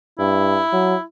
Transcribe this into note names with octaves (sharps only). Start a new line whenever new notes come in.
G2 E4
F#3